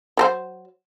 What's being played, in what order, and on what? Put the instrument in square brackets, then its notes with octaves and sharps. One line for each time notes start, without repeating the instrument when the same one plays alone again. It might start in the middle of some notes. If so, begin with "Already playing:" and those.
[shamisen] F#3 A4 C5